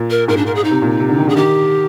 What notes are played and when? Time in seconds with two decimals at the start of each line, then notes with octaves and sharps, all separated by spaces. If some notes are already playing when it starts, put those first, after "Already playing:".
Already playing: A#2
0.10 A#4
0.28 G#2 A#4
0.37 D4
0.46 A#4
0.55 G#4
0.64 D#4
0.71 C3
0.82 A#2
1.00 C3
1.09 D3
1.18 D#3
1.27 D3 G#4
1.36 D#3 G4